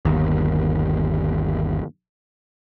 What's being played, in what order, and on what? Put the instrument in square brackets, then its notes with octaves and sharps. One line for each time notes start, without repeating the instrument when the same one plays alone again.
[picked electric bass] G1 D#2